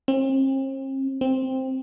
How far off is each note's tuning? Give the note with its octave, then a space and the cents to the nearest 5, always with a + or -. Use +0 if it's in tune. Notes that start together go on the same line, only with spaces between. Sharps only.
C4 +40
C4 +5